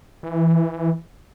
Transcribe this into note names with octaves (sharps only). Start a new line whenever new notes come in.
E3